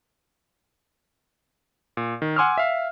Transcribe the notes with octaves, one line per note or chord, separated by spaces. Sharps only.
A#2
D#3
F#5 G#5 C6 D6 E6 F6
E5 F5